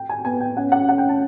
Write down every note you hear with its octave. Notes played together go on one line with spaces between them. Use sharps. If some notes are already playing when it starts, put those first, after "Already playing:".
Already playing: G5
G#5
B3 G#5
G5
C#4 F#5
F#5
F#5
G5
A5